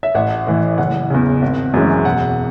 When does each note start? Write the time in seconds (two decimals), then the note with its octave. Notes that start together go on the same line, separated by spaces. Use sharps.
0.03 E5
0.15 A1 F#5
0.47 A2 E3
0.78 F#1 F#5
1.10 E2 C#3
1.42 G#1
1.74 F#2 E3 G#3 C#4
2.05 E1 F#5